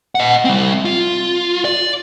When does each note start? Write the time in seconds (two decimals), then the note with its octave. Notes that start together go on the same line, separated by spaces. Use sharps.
0.15 D#5 F#5
0.45 G3 C4
0.85 F4
1.65 D5